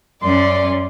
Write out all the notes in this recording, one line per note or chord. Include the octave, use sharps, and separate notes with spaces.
F#2 C#4 D5 C6